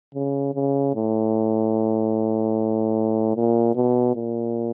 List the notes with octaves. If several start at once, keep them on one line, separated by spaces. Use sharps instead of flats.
C#3
C#3
A2
A#2
B2
A#2